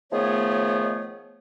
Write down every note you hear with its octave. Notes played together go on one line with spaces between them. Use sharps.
D#3 F3 A3 B3 G#4 C#5